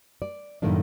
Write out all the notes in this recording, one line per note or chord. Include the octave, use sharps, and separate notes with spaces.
D5
F#2 A2 D#3 A3 A#3 D4